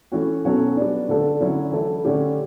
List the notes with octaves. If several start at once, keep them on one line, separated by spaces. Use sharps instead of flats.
E3 A3 C#4 F#4
B2 F#3 C#4 F#4 A4
G3 B3 D4
D3 A3 D4 A4
D3 F#3 C#4 E4
E3 A3 E4 A4
D3 A3 C#4 G4